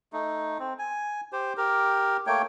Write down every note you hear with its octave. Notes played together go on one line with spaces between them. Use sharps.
A3 D#4
C4
G#5
G4 C5
G4 A#4
A3 A#3 C#5 G5